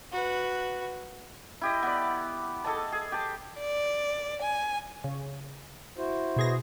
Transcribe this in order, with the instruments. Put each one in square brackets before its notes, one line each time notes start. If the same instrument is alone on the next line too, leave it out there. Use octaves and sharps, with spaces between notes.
[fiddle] F#4 B4
[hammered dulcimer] E4 G4 D#5
B3 D5
G#4 A4 D#5 A5
G#4
G4 A5
[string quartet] D5
G#5
[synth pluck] C#3
[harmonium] E4 F#4 C5
[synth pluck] B2 G#4 A#6